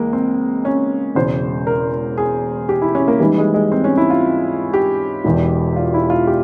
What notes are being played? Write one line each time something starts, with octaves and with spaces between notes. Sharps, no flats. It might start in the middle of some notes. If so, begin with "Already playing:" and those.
Already playing: C#2 E3 G#3 A#3
C4
C#4
E1 E2 C#3 C5
A#4
G#4
G4
E4
C#4
A#3
G#1 G#2 E3 G3
G#3
G#3
C4
C#4
E4
F4
G4
E1 E2 E3
F4
E4
F4
G4